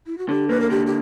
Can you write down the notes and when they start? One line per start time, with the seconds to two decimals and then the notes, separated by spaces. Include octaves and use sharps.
0.07 E4
0.18 F#4
0.29 D3 G4
0.49 A#3 B4
0.61 A#4
0.70 D3 G4
0.87 G4